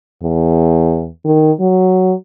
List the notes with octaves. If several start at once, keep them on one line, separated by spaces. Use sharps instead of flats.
E2
D#3
F#3